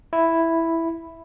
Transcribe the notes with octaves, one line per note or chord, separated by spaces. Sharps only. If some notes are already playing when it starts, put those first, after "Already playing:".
E4